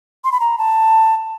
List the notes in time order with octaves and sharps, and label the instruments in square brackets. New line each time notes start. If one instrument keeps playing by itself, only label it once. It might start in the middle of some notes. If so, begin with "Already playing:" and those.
[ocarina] C6
B5
A#5
A5